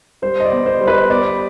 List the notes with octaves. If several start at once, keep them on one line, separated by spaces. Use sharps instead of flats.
G3 C5
D#5
D5
B3
C5
G3
B4
B3 D5